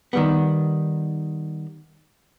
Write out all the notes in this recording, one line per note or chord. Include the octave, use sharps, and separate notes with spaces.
D#3 G3 B3